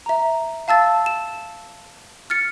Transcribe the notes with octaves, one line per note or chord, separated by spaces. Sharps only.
E5 A#5
F5 A5 E6 A6
E7
F6 A6 C#7